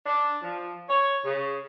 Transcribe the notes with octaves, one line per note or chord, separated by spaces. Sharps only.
D4
F3
C#5
C#3